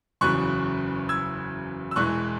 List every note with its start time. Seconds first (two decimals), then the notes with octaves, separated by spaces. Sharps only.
0.21 F#1 E2 C#3 F#3 C#6 F#6
1.09 E6 G#6
1.91 E6
1.96 E1 E2 E3 G#3 C#6 F#6